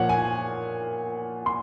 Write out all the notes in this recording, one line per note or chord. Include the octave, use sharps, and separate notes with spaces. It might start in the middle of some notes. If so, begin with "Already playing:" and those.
Already playing: A#2 F3 C#5 F#5
G#5
C6